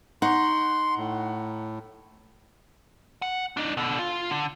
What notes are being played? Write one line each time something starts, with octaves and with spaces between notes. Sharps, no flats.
D#4 F#5 A#5 C6 C#6
A2
F#5
D4 D#4
B2 D3
F4
D3